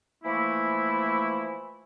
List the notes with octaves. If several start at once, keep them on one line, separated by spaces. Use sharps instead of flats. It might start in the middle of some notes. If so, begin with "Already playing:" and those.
E3 F3 A3 A#3 E4